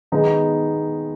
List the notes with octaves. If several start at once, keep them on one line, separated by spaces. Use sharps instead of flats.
D#3 G#3 B3 D#4